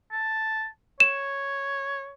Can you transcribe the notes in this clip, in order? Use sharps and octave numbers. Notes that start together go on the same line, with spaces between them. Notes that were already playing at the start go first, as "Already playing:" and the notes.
A5
C#5 E7